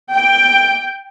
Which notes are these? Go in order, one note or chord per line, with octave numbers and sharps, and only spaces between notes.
G5